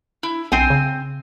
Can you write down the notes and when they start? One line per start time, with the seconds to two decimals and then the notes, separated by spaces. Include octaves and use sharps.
0.23 E4
0.52 B1 C4 G#5
0.70 C#3